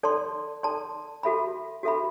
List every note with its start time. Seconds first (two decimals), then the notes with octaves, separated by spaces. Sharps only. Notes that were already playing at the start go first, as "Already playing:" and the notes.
0.03 A4 D5 A5 C6
0.63 A4 D5 A5 C6
1.23 F#4 A4 E5 B5
1.83 F#4 A4 E5 B5